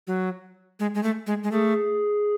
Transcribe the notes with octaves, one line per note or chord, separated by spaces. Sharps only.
F#3
G#3
G#3
A3
G#3
G#3
A3 G#4